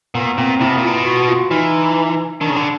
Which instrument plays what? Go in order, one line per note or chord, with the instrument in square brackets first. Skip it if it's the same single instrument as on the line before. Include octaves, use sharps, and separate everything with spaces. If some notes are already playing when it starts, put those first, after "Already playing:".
[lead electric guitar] A#2 [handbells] B3
[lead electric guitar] A#2 [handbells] C4
[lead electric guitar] C3 [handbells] E4
[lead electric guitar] B2
A#2
[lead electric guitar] B2 [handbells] F4
[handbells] F#4
F4
[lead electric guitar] E3 [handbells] D#4
[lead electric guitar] D#3 [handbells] D4
[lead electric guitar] C#3
D3